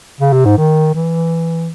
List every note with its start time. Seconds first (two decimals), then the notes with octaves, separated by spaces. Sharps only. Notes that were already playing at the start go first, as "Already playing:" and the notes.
0.21 C#3
0.33 C3
0.45 G#2
0.58 D#3
0.94 E3